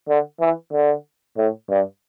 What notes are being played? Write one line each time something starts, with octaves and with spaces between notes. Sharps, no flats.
D3
E3
D3
A2
G2